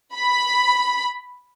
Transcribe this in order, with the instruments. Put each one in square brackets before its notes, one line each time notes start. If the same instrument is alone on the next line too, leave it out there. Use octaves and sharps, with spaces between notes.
[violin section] B5